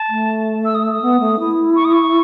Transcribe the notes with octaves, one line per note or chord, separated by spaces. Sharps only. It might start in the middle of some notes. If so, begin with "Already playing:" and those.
Already playing: A5
A3
E6
D#6
E6
D#6
B3
A3
E4
C#6
D#6
C#6